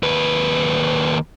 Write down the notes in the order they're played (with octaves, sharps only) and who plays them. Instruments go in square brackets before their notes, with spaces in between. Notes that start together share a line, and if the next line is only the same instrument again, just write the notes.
[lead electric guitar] D#2 B4